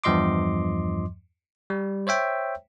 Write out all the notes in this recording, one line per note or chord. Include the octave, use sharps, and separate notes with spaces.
E2 G2 F3 D#5 C6 D6
G3
C5 C#5 E5 G5